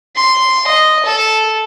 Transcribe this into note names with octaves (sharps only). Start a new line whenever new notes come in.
C6
D#5
A4